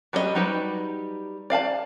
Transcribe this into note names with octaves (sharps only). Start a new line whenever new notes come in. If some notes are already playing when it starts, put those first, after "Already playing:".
F#3 G3 C#4 G#4 D#5
F#3 G3 D#4 G4 B4
D5 F5 G#5 A5